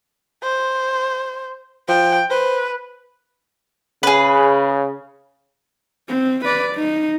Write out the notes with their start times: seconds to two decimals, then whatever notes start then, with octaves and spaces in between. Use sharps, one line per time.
0.43 C5
1.88 F3 G5
2.31 B4 C5
4.03 C#3 G#4 B4
6.08 C4
6.45 B4 D5
6.76 D#4